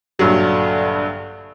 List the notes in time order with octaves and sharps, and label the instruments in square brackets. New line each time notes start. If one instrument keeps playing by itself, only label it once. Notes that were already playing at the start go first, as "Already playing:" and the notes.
[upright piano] A#1 G2 F#3 [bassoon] D3